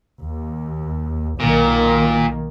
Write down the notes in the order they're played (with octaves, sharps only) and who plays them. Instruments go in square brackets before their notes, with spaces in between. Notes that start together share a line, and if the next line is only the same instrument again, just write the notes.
[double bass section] D#2
[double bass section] B1 D#3 A#3 [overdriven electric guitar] A#2